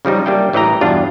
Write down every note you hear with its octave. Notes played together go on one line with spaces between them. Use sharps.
C#3 F3 G3 D#4
G3 A#3 D4 E5 G5
A1 E3 D#5 G5 A#5
E2 G2 B2 D4 F4